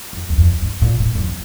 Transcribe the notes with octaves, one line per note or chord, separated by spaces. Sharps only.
F2
E2
F2
G2
A#2
A2
E2
F2